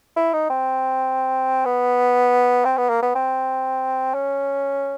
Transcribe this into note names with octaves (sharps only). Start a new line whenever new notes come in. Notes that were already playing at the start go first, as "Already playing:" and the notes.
E4
D#4
C4
B3
C4
B3
A#3
B3
C4
C#4